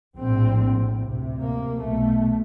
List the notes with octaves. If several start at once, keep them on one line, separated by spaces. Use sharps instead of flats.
A#1 A2 C4
D2 C3
A#3
B1 B2 A3